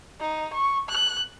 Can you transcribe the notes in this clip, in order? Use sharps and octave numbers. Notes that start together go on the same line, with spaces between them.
D#4
C#6
F#6